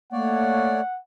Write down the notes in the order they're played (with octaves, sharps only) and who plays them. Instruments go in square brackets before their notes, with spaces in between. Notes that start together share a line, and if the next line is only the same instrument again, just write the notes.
[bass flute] A3 [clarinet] A#3 [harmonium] C#5 D5 [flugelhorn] F#5